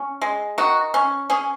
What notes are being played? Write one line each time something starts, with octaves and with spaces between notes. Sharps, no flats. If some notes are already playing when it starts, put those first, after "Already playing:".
Already playing: C#4
G#3
D#3 F#4
C#4
C#4 G#4